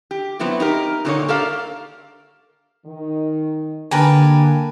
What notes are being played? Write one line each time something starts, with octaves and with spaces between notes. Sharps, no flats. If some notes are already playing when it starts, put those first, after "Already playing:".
G4
F#3 B3 C4 E4 F#4
D#4 G4 A#4
A#2 D3 F#3 A#3 D#4 C#5
G4 A4 A#4 D5 F5
D#3
D3 A#3 G4 A#4 B4 G#5 A5